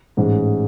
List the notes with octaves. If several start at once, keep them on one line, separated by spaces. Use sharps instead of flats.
A1 G#2 G#3